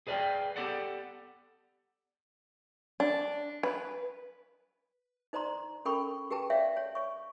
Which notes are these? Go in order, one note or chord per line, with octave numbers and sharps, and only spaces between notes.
G#4 B4 D5 E5 F5 G5
B3 G4 A4 D5 F#5
D4
B4
D#4 C5 D5 A#5 C6
C#4 A4 A#4 G5 B5 C#6
G4 G#4 B4 G5 A5
C#5 D5 E5 F5 G5
C#5
C#5 C#6